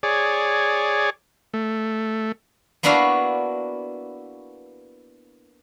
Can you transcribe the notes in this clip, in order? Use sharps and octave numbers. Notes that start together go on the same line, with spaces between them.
G#4 C#5 D5
A3
A#3 B3 D4 E4 F#4 F5